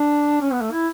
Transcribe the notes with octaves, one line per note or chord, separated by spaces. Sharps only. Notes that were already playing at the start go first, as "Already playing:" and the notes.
Already playing: D4
C#4
B3
A3
E4